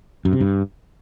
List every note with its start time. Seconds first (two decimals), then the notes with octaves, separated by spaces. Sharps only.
0.25 F#2
0.33 C3
0.40 G2